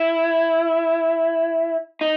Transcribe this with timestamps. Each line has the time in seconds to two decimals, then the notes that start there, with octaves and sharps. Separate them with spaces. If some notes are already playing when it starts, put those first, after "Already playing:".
Already playing: E4
2.01 D#4